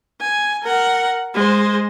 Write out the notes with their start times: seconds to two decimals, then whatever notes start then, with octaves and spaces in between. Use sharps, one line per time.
0.21 G#5
0.63 A#4 F#5
1.34 G#3 C5